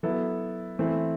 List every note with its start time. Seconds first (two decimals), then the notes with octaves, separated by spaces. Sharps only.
0.03 F#3 B3 E4 A4
0.79 E3 A3 C4 E4